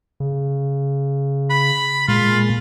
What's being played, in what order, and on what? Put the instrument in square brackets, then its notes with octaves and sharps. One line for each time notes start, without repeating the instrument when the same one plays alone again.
[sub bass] C#3
[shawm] B5
[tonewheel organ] A#2 G#3 [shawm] F4